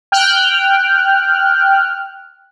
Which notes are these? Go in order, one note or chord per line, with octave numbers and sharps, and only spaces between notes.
G5 F6 F#6